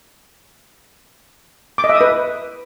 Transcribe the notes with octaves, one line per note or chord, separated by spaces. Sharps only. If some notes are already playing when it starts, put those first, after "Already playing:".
D6
D#5
E5
D#6
B4